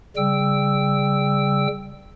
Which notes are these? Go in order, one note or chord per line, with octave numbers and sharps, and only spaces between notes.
C#3 G3 G5 E6